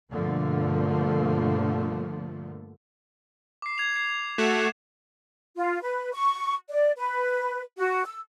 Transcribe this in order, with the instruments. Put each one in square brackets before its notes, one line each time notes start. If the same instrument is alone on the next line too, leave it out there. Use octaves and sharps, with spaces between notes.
[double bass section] G2 B2 D3 F3 A3 A#3
[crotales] D6 C7
G#6 F7
C7
[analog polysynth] A3 F#4 [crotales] E7
[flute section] F4
B4
C#6
D5
B4
F#4
E6